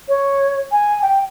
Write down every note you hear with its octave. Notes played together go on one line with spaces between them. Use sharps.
C#5
G#5
G5